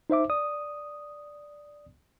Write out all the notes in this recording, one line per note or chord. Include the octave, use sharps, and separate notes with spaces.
D#4 C5 E5 D6
D5 D#6